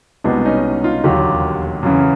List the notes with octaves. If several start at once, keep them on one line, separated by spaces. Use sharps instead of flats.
C2 B2 G#3 B3 C4 D4
C#4 D#4
D#4 F4
E1 D#2 D3 F#3 A#3 F4 G4
F#2 C#3 E3